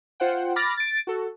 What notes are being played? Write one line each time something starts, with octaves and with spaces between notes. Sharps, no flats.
F4 C5 F#5 G5
B5 D6 F6 A6 A#6
A6 D7
F#4 A4